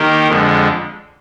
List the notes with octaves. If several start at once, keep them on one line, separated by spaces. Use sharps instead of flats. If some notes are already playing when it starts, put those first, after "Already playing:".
Already playing: D#3 A#3 D#4 G4
F2 D3 G#3